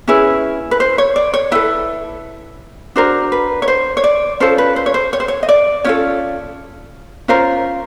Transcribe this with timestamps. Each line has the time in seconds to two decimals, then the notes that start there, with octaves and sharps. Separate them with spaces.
0.08 C#4 E4 G#4 B4
0.71 B4
0.80 C5
0.98 C#5
1.16 D5
1.34 C#5
1.52 E4 A4 B4
2.96 D4 F#4 A#4 C5
3.32 B4
3.62 C#5
3.68 C5
3.97 C#5
4.04 D5
4.40 C#4 F4 A4 C5
4.58 B4
4.76 C5
4.86 C#5
4.94 C5
5.13 C#5
5.20 C5
5.28 C#5
5.43 D#5
5.49 D5
5.84 C#4 F4 A4 C#5
7.28 C#4 F4 A#4 C5